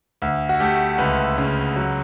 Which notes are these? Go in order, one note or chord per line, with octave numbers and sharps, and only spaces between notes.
D2
F#4
A3 G4
C#2 B4
C#3
F#3